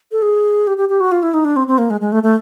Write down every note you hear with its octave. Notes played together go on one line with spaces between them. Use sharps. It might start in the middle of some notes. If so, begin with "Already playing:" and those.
A4
G#4
G4
G4
G4
F#4
F4
E4
D#4
D4
C4
C4
A#3
G#3
G#3
A3
A3